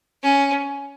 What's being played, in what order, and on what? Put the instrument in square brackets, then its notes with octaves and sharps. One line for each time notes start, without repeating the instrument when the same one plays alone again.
[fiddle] C#4